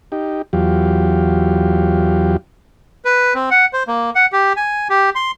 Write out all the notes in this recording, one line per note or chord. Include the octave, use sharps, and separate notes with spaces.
D#4 G4
E2 F#3 F4 G4
B4
C4
F#5
C5
A#3
F#5
G4
G#5
G4
C6